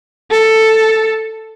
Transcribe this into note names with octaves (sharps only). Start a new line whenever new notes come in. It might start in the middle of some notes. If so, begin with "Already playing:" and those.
A4